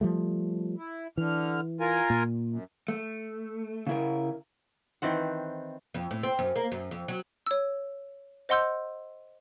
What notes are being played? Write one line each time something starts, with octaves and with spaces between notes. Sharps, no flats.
F3 G3 A3
E4
D3 E3 F6
F4 A#4 G#5
A#2
F#2
A3
C#3 E4 A#4
D#3 E3 C4 F#5
F2
A2
C4
F#2
A#3
F#2
F2
F#3
C#5 E6
C5 D#5 F#5 C6 E6 G6